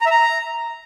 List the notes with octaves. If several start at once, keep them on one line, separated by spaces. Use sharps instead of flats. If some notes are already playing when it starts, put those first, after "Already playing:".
A#5
E5
A#5